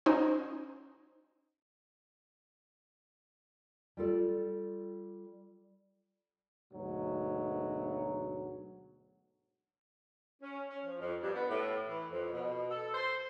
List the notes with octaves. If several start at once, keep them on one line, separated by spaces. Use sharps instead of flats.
C#4 D#4 F#4 C5
G3 F4 A4 D5
D2 G#2 B2 F#3
C#4
C#4
F3
F2
G2
B3
A2
E3
F2
B2
A4
C5